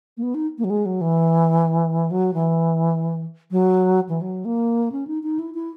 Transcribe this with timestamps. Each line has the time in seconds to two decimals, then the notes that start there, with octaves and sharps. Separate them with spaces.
0.17 A#3
0.23 B3
0.34 D#4
0.58 A#3
0.64 F#3
0.70 G#3
0.85 F#3
1.01 E3
2.11 F#3
2.34 E3
3.51 F#3
4.09 E3
4.21 F#3
4.45 A#3
4.92 C#4
5.07 D#4
5.23 D#4
5.39 E4
5.54 E4